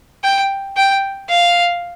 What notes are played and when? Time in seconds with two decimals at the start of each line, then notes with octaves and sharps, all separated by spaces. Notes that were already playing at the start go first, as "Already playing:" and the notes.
0.24 G5
0.77 G5
1.29 F5